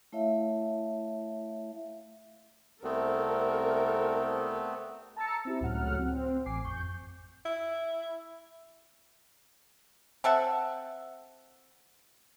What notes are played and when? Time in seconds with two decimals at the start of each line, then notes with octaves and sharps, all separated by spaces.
0.13 A3 E4 C#5 E5 F5
2.83 C2 A3 B3 C4 A4 A#4
5.16 A5 A#5 E6 A6 C#7
5.45 C4 E4 G4
5.61 C#2 A2 F#3 F#5 F6
5.99 C4
6.46 A1 G#5 D6 C7
6.64 F2 C#6 G6
7.45 E4
10.24 C4 A4 E5 F#5